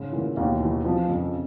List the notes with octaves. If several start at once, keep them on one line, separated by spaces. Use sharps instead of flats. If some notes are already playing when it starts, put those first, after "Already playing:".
Already playing: G#2 C#3
A#2 E3
D#2 B2
B2 E3
C3 F3
F2 C#3